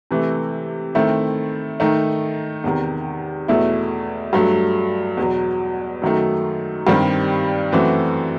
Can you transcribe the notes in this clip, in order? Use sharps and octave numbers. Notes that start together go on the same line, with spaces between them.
C3 E3 A3
D#3 A3 C4 E4
D#3 A3 D#4
E2 C3 D#3
E2 B2 A3 E4
G2 F#3 A3
E2 B2 F#3
F#2 D#3 F#3 A3 D#4
G2 D#3 G3 C4
F#2 E3 A3 C4 F#4